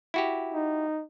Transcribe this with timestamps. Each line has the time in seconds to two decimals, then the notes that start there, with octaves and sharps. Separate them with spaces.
0.14 E4 F#4 G4
0.54 D#4